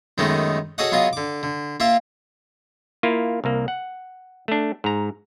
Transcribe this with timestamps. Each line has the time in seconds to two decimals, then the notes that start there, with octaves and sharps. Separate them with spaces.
0.18 F#2 D#3 G#3 A3 B3 D#4
0.78 F#4 G#4 A4 C#5 D#5 F#5
0.92 F#3 B3 F4 G#4 D#5
1.13 D3 D6
1.43 D3
1.80 A#3 F4 E5
3.03 A#3 E4 F4
3.44 C2 A#3
3.68 F#5
4.48 A3 D4
4.84 G#2 A#5